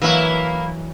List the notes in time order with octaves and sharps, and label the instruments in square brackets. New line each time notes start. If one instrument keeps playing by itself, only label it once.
[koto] E3 F#3 [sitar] A#3 E4